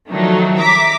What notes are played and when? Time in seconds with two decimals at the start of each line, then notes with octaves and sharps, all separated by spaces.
0.10 D#3 F3 F#3 A3 D4 D#4
0.57 E5 A#5 D6 B6